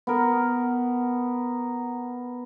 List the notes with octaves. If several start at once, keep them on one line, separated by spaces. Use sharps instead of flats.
B3 A#4